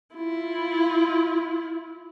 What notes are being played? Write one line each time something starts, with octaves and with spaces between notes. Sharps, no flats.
E4 F4